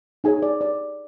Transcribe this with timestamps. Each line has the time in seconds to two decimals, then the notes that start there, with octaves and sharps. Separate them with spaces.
0.24 D#4 G#4 C#5 G#5
0.42 D5
0.61 D5